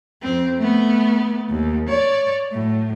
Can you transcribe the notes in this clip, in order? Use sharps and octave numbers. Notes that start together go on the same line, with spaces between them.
F2 C4
A3 B3
D#2
C#5 D5
A2 F#3